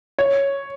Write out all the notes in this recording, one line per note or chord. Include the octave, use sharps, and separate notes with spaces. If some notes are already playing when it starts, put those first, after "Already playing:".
C#5